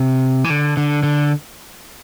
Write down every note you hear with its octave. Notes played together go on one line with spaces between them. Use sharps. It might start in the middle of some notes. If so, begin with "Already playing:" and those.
Already playing: C3
E3
D3
D3
D3